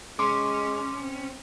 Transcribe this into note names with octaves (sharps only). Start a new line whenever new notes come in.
G#3 C#4 C6 D6
C4